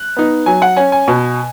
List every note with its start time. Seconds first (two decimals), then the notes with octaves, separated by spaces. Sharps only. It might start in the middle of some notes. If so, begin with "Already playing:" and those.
Already playing: F#6
0.17 B3 D#4
0.46 F#3 G#5
0.62 F#5
0.77 C#4 G#5
0.92 G#5
1.08 B2